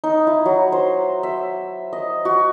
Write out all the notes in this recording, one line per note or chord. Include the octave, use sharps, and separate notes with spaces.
D#4
E4
F#3
C5
E5
D#5
F#4